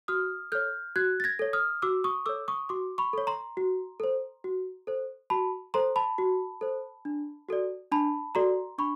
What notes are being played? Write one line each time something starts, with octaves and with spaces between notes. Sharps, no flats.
F#4 D#6 F6
A4 C#5 F6 G6
F#4 F#6 G#6
A6
G#6 A#6
A4 C#5
D#6 F6
F#4 D6 E6
C#6 D#6
A4 C#5 D6 E6
C#6 D#6
F#4 C6 D6
B5 C#6
A4 C#5
A#5 C6
F#4
A4 C5
F#4
A4 C5
F#4 A5 B5
A4 C5 A#5 C6
A5 B5
F#4
A4 C5
D4
F#4 A4 D5
D4 A5 B5
F#4 A4 D5 A#5 C6
D4 B5 C#6